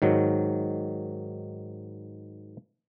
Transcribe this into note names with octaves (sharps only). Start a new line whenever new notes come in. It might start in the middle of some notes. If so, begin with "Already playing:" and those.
G#2 D#3 F#3